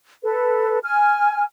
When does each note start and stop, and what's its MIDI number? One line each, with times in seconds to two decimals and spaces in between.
0.24 0.79 69
0.24 0.79 71
0.82 1.42 80
0.82 1.42 89